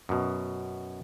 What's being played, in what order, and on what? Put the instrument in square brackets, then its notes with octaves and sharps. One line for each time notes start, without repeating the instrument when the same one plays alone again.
[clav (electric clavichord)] F#2 B2